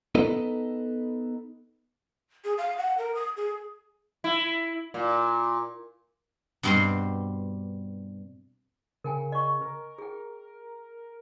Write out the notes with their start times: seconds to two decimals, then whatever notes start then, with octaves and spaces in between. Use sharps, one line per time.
0.15 B3 D#4 A4 B4 D#5
2.45 G#4
2.58 F5
2.77 F#5
2.98 A#4
3.15 D#6
3.37 G#4
4.24 E4
4.94 A#2
6.63 G2 B2 G3 C4 F#4 C6
9.04 C#3 A#4 G5 G#5
9.32 D#5 C#6
9.61 A#4
9.98 G#4 G5